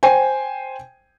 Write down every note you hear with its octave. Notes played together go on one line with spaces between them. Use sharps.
C5 G5 G#5